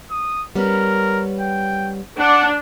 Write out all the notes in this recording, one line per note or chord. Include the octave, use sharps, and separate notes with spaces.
D#6
G3 B3 C#4 A#4
G5
D4 F#5